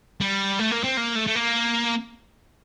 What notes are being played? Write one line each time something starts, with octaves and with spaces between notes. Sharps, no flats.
G3
A3
A#3
C4
A#3
A3
A3
A#3